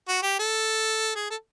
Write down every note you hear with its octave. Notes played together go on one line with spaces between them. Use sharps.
F#4
G4
A4
G#4
A4